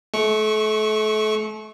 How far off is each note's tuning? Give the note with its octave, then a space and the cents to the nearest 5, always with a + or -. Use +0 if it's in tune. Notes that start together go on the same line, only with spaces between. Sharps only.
A3 -35 C#6 +0